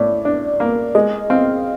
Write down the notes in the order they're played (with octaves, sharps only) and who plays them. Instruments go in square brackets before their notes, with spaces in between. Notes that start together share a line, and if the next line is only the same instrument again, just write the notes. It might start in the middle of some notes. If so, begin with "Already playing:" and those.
Already playing: [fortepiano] A2 [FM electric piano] D5
[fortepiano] D4
A#3
[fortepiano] G#3 [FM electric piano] D#5
[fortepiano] C4 [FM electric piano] F5